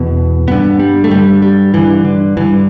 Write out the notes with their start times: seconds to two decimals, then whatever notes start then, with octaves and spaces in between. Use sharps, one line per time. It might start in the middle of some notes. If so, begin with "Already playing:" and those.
Already playing: E2 B2 B3
0.48 G2 D3 B3
0.79 G3
1.04 A3
1.11 G2 D3 G3
1.42 G3
1.74 G2 D3 E3
2.05 D3
2.37 G2 D3 E3